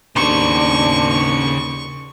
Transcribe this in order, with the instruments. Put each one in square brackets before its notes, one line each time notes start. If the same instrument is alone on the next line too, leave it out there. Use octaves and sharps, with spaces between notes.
[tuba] D#2 [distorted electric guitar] C#3 C5 [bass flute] D4 [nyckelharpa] C#6